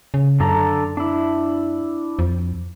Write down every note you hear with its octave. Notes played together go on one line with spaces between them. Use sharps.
C#3
F#2 D3 A4 A#5
D4 E4
F2